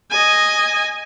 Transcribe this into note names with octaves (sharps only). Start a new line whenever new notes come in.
D#5 G#5